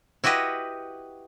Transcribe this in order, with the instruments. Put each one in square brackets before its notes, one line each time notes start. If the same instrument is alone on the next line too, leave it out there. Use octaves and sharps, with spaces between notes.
[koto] E4 F#4 G4 B4 D#5